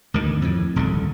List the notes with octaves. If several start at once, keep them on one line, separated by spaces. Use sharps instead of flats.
D2 G#2 D#3
F2 A2
D#1 C2 G#2 D3